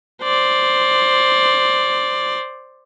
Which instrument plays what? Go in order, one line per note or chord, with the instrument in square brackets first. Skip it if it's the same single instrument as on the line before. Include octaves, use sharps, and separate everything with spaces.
[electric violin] C5 D5